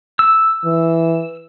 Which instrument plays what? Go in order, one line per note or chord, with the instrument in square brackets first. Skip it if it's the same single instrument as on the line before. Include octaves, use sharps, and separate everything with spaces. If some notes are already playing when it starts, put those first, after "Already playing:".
[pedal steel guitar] E6
[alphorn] E3